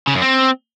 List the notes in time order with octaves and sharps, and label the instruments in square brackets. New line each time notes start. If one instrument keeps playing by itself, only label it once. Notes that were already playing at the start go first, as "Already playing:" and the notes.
[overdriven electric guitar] C#3
F#2
C4